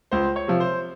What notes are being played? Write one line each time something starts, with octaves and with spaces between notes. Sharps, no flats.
C#2 C5
C#5
C3 F3
C5